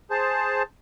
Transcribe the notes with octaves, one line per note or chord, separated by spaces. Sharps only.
G#4 C5 A5